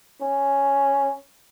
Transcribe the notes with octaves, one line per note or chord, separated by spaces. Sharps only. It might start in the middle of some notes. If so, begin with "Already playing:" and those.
C#4